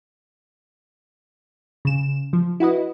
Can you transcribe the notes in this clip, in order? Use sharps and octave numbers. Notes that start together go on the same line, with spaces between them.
C#3 E7
F3
E4 F#4 B4 D#5